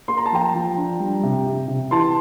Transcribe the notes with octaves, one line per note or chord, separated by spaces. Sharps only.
A#3 C6
A#5
A5
F3 G5 A#5
F3
D4
G3
C3
C3
C3
E3 A5 C6